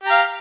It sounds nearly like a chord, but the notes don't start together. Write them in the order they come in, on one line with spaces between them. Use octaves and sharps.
G4 A#5 F5